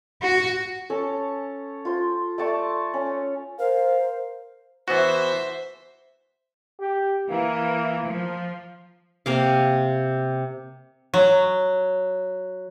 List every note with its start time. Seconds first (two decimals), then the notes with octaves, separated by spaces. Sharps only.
0.22 F#4
0.90 C#4 A4 C#5 A5
1.85 F4 C5
2.38 A3 D5 A5 C#6
2.94 C#4
3.59 A#4 C5 F5
4.88 E3 B3 F#4 C5 E5
6.80 G4
7.30 E3 A#3
8.06 F3
9.26 C3 A#3 F5
11.14 F#3